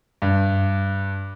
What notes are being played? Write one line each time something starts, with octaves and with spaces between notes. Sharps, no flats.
G2